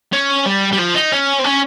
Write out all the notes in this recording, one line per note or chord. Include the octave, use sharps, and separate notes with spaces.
C#4
G3
G3
F3
D#4
C#4
C4
C#4